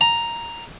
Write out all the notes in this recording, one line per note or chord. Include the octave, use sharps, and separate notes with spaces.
A#5